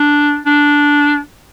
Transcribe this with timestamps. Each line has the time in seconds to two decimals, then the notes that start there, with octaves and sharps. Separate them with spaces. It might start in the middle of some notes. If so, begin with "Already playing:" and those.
Already playing: D4
0.46 D4